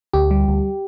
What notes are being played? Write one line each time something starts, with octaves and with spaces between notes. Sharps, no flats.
D2 G4
G3
D2